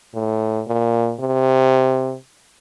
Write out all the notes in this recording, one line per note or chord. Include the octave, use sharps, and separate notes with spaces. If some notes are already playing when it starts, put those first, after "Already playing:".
A2
A#2
C3